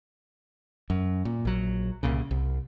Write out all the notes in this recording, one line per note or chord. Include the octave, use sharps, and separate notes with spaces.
F#2
A#2
A#1 F#3
C2 A#2 C#3
C2